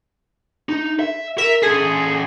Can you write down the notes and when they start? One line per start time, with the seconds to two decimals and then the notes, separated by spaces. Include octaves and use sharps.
0.69 D#4
0.99 E5
1.38 A#4 E5
1.62 C#4 G#4 A4